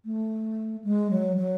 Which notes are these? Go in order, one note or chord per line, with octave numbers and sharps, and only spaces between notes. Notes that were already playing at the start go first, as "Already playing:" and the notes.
A3
G#3
F#3
F#3